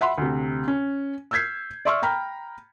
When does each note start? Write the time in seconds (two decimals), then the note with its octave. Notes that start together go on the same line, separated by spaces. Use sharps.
0.01 E5 F#5 B5 C6
0.18 D2 C3
0.68 C#4
1.31 E6 F6 G6 G#6 B6 C7
1.85 D5 E5 C6 C#6 E6 F6
2.02 G5 A#5 B5 F6